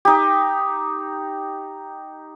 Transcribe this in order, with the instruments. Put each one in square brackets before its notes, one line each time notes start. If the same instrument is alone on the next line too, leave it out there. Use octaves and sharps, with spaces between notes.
[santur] D#4 G4